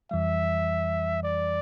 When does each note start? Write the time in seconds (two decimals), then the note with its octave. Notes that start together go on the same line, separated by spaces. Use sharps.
0.11 F2 E3 G3 E5
1.23 D5